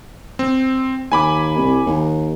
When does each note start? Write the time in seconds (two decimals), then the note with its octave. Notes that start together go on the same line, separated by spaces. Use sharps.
0.39 C4
1.12 D#2 G#5 B5 D6
1.57 C2
1.86 D#2